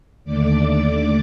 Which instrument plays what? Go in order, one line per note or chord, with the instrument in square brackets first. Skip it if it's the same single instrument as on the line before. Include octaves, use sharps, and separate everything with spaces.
[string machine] D#2 D3 A3 D5 D6